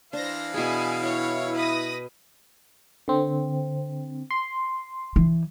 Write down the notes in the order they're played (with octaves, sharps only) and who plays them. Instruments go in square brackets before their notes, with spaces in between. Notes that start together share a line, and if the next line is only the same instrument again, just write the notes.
[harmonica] E3 F5 [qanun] D4 [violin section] C5 A#6
[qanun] B2 G#4 [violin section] E4 G#5
[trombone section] E4 [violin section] C#5
[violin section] B4 D#6 A#6
[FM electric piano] D3 C4
C6
[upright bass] E3